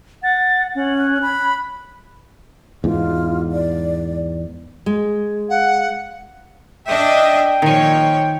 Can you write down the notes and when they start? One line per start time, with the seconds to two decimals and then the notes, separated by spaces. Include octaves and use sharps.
0.23 F#5 A6
0.75 C#4 F#5
0.99 F#6
1.22 B5
2.84 E2 G#2 F4
3.52 D5
4.86 G#3
5.50 F5 F#5
6.88 D4 D#5 E5 G5
7.62 A#2 D#3 F3 C#5 G#5